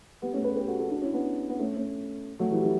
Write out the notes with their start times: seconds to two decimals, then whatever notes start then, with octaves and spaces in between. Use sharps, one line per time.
0.22 G3 B3
0.33 A3 C#4
0.44 G4 B4
0.56 G4 B4
0.68 F#4 A4
0.79 F#4 A4
0.91 D4 F#4
1.02 C#4 E4
1.13 B3 D4
1.49 B3
1.59 A3 C#4
1.76 A3 C#4
2.39 F#3 A3
2.51 E3 G3
2.62 E3 G3